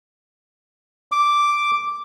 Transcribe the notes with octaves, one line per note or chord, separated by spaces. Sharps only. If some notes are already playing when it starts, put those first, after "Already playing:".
D6